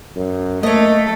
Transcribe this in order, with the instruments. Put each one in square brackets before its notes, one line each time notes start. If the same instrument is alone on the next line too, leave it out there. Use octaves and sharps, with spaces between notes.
[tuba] F#2
[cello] A3 A4 [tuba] A#3 [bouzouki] C#5 D#5